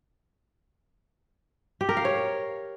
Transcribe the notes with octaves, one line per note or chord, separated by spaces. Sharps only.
G4
A#4
F5
C#5